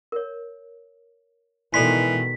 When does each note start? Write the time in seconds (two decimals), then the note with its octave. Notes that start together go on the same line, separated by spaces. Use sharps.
0.12 A#4 C#5
1.74 B2 D#3 E3 G#3 A4 D5 C6 B6